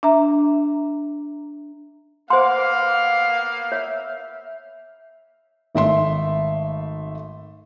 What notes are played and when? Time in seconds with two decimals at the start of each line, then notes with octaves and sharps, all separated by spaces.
0.03 D4 E5 A#5
2.30 A#3 B3 C5 F5 F#5 C6 D6
3.72 C#5 E5
5.75 G#1 A3 E5 C6